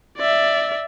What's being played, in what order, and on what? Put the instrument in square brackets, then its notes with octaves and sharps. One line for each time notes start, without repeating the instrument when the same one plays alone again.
[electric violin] D5 E5